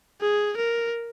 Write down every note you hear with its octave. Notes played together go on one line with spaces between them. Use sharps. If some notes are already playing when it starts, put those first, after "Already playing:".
G#4
A#4